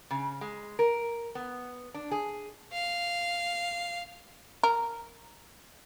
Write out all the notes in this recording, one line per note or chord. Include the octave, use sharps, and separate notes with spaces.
C#3
G#3
A#4
B3
D4
G#4
F5
A#4